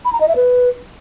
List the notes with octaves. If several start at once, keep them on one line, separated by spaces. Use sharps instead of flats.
B5
A#5
D#5
E5
B4